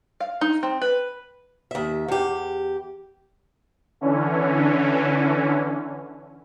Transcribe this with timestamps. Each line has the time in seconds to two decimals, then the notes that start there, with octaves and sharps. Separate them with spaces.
0.20 F5
0.41 D#4
0.63 C4
0.82 B4
1.71 D#2 E5
2.08 E2 G4
4.01 D3 E3 C#4